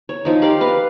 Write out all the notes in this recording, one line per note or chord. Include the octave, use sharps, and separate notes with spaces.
C#5
F3 D#4
G4 A#4 D5 F5
B4 F5